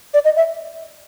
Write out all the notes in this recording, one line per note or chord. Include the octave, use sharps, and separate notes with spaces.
D5
D#5
E5